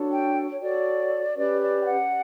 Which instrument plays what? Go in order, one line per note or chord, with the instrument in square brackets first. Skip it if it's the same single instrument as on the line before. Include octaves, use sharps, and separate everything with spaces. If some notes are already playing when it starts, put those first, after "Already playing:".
Already playing: [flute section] D4 F#4 A4 C#5
G5
C#5
F#4 A4 C#5 D5
C#4 G4 B4 D5
D5
G5
F#5